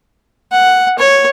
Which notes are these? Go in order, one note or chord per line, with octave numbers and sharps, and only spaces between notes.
F#5
C#5